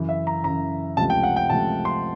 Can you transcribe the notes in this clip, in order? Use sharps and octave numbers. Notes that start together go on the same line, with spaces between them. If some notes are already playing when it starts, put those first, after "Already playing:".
Already playing: F#2 C#3 E3
E5
A#5
F#2 C#3 E3 A#5
C#2 C3 F3 A3 A5
G5
F#5
G5
C#2 C3 F3 A3 A5
C6